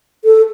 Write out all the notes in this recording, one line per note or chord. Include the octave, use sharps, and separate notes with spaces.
A4